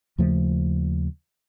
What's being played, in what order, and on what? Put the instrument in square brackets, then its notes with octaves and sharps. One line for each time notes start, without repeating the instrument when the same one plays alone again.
[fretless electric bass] D#2 C#3 F3 A3